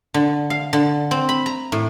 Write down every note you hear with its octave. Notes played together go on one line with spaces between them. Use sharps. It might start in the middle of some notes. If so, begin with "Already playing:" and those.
D3
F5
D3
C4
B5
A#5
A2